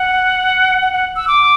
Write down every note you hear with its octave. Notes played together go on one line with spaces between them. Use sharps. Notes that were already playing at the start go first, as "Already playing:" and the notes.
Already playing: F#5
F#5
F#5
E6
D6